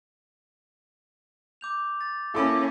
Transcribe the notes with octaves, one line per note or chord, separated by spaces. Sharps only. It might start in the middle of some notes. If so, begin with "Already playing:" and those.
D6 G6 F7
A6
A#3 C#4 E4 A4 D6